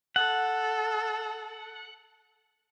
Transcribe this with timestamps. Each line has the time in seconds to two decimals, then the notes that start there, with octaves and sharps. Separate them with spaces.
0.16 A4 F#5